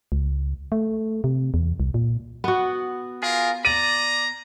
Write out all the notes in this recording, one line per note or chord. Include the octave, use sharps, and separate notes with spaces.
C#2
A3
C3
E2
C2
A#2
B3 F#4
F4 G#4 A#4
D5 A#5 D#7